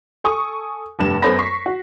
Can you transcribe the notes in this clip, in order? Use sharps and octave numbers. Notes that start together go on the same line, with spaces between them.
A4 G#5 C#6 D#6
F1 G2 E7
F#2 B3 A4 C5 B5 A#6
C#6 B6 C7
F#4